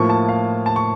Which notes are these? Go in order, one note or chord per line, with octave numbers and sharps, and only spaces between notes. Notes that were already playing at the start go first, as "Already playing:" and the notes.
Already playing: A2 F3 A#3 C#6
A5
F5
A5
C#6